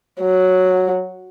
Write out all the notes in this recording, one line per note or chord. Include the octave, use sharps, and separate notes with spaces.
F#3